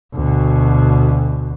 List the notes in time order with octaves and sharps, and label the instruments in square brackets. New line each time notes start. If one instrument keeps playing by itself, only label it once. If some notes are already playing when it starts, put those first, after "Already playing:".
[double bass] D2 B2